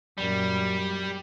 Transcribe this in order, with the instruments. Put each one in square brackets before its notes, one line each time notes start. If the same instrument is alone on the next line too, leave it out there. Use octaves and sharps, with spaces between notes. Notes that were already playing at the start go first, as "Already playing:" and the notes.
[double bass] F#2 A#2 [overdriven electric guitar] G3